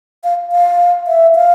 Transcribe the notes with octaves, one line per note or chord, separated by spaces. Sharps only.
F5
F5
E5
F5